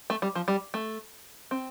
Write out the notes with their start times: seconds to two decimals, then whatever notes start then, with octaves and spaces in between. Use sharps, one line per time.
0.10 A3
0.22 G3
0.35 F3
0.48 G3
0.74 A3
1.51 C4